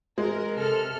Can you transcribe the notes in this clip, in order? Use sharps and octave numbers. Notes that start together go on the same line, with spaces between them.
G#3 A#4
C3 A4 F6